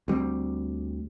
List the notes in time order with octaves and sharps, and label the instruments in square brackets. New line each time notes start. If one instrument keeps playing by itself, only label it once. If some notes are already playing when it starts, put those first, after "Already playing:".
[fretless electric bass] D2 G3 A#3 C4